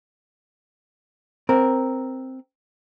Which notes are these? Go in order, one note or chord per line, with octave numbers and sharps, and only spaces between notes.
C4 A#4